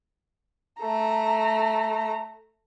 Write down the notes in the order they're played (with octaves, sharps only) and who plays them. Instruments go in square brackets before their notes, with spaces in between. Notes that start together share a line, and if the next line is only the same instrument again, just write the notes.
[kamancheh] A3 A#5 [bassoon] A4